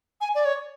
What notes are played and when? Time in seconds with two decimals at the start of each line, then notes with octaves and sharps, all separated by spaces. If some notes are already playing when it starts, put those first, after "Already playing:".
0.21 G#5
0.35 D5
0.45 C#5